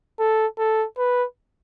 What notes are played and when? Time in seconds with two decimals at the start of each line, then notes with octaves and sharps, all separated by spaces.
0.19 A4
0.58 A4
0.98 B4